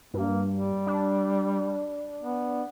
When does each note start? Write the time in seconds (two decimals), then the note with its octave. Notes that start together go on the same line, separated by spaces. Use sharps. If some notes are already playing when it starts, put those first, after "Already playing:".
0.14 G2 A#3
0.53 G3
0.87 D4
2.23 B3